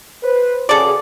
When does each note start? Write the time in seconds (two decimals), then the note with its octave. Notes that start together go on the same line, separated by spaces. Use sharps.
0.24 B4 C5
0.69 C#3 F#4 G#4 A4 D5